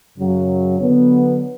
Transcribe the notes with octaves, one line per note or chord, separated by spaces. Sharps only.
F#2 C#3 F#3
D3 F#3 B3